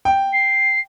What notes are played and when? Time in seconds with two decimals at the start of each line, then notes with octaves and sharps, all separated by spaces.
0.05 G5
0.33 C7